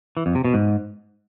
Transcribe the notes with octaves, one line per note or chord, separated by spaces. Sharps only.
E3
F2
C3
B2
G#2